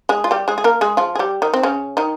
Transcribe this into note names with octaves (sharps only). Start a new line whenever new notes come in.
G#3 G#4
F4
G3 G4
G#3 G#4
G#4
A#3 A#4
G#3 G#4
F3 F4
G#4
G3 G4
D#3 D#4
C4
C#3 C#4
D#3 D#4